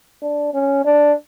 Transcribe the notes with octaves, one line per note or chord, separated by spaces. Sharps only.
D4
C#4
D4